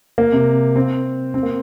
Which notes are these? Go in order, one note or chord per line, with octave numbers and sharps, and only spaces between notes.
A#3
C3
C4
C4
A#3